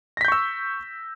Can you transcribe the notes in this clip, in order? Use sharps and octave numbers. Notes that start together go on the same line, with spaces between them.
C#6 E6 G6 A#6 B6